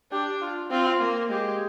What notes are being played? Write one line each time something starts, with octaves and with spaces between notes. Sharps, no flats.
D4 G4
F4
C4 F4
A#3
G#3 G4